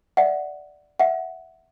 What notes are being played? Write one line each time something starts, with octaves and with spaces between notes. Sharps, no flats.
D5 E5 F#5
E5 F#5